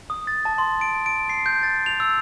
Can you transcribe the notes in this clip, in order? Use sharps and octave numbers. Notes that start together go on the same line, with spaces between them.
D#6
A6
A5
C6
D7
D7
C7
G6
A6
F7
E6